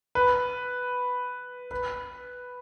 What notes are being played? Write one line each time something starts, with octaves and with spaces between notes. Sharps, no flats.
B4
B4